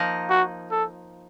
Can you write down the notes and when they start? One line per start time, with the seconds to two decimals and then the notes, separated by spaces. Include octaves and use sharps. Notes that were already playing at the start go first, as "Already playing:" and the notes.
Already playing: F3 A#3 D#4
0.30 F#4
0.71 A4